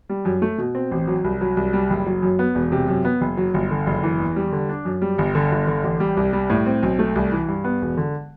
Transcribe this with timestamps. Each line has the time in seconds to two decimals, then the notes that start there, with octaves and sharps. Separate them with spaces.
0.09 G3
0.25 F#2
0.42 A3
0.58 B2
0.75 C4
0.91 A1
1.08 F#3
1.24 C2
1.41 F#3
1.57 C2
1.73 G3
1.90 F#1
2.06 F#3
2.22 F#2
2.39 B3
2.55 E1
2.72 C3
2.88 F#2
3.05 B3
3.21 F#1
3.37 F#3
3.54 G1
3.71 D3
3.87 F#1
4.03 E3
4.20 E2
4.36 G3
4.52 D3
4.69 D4
4.85 F#2
5.02 G3
5.18 G1
5.35 D3
5.52 G1
5.67 D3
5.84 A1
6.00 G3
6.17 C2
6.33 G3
6.50 A2
6.66 C4
6.83 B1
6.99 A3
7.15 C2
7.32 E3
7.48 G2
7.64 B3
7.81 E1
7.97 D3